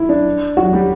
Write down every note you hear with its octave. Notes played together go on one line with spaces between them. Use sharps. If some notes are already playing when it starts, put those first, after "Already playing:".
Already playing: E4
D4
F#3 F#4
G3 G4